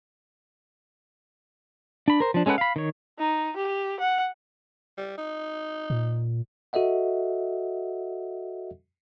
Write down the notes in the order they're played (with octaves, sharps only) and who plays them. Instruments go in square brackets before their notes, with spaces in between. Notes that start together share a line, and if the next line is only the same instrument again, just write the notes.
[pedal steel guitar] D4 B5
A#4 C5
F3 D4
G#3 C#4 A4 B4 F#5
F5 B5
D#3 C#5
[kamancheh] D#4
G4
F#5
[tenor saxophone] G3
D#4
[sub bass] A#2
[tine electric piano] F#4 A4 D#5 E5 F#5